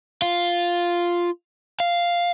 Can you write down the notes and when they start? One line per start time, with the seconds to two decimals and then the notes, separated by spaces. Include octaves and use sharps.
0.22 F4
1.80 F5